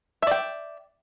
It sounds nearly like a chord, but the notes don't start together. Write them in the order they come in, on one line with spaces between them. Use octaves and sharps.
E5 D5 G5